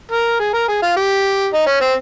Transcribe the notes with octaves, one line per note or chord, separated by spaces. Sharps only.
A#4
G#4
A#4
G#4
F4
G4
D#4
C#4
C4